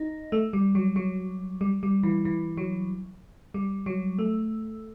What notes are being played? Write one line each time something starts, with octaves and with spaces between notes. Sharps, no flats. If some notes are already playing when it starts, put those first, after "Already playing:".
Already playing: D#4
A3
G3
F#3
F#3
G3
G3
E3
E3
F#3
G3
F#3
A3